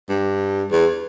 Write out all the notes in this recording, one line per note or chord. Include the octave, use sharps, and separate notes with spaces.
G2
E2